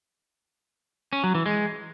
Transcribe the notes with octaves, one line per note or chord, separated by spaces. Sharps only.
C#4
F#3
E3
G#3